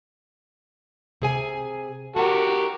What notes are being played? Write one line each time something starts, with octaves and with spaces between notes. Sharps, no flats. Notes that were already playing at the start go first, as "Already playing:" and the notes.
C3 G#4 G#5
F#4 G4 A#4 F#5